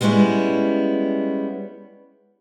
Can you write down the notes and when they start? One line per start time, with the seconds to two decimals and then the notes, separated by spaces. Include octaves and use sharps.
0.01 G3 G#3 B3 C#4 E4